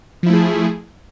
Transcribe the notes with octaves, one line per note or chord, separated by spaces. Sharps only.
F3 A3 E4 G#4